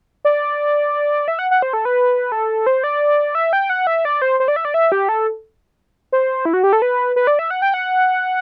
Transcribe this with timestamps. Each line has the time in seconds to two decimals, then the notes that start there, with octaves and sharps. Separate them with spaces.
0.25 D5
1.28 E5
1.39 F#5
1.51 F#5
1.62 C5
1.73 A4
1.85 B4
2.32 A4
2.67 C5
2.84 D5
3.35 E5
3.53 G5
3.70 F#5
3.87 E5
4.05 D5
4.22 C5
4.40 C5
4.48 D5
4.56 E5
4.65 D5
4.74 E5
4.92 G4
5.09 A4
6.13 C5
6.45 E4
6.53 F#4
6.63 G4
6.73 A4
6.82 B4
7.16 B4
7.27 D5
7.39 E5
7.51 F#5
7.62 G5
7.74 F#5